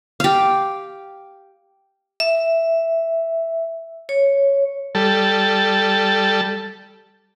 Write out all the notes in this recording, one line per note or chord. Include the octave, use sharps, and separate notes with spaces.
G4 F5
E5
C#5
G3 A4